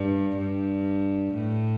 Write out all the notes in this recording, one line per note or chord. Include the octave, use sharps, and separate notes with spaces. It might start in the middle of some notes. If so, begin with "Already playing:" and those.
Already playing: G2
G2
A2